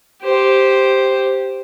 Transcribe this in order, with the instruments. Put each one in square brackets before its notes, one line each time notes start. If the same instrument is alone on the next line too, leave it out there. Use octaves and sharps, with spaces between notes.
[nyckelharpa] G4 C5